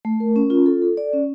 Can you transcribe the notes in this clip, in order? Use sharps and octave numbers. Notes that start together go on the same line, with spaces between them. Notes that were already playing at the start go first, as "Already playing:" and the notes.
A3
A#4
C#4
F4
A4
A4
D5
C#4